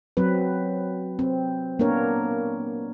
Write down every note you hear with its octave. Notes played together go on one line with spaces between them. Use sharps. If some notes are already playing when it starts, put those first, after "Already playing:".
F#3 C4 B4
C4
A#3 B3 D4 A#4 C#5